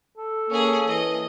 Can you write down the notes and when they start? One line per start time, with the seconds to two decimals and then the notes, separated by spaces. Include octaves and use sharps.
0.17 A4
0.50 A#3 C#4 G#4
0.87 E3 D#5